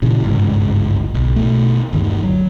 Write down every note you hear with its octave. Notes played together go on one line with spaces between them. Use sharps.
A#2 C#3 E3
G1 C#2 G#2
B1
B2 A3
G1 D#2 D#3
F#3